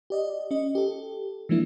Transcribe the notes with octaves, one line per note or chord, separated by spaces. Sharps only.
G4 D5 D#5
C#4 D#5
G4 A4
E3 F3 G#3 A#3 D4 E4